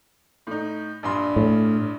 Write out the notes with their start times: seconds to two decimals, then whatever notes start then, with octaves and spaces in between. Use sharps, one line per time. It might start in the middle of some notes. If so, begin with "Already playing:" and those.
0.47 A2 D#4
1.03 A#1 G2 C6
1.36 A2